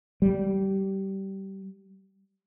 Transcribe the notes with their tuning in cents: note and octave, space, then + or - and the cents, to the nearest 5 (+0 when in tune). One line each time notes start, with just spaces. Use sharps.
G3 -20